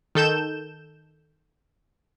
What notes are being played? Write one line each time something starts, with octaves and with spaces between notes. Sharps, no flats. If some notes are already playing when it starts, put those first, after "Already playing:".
D#3 A4 G6 E7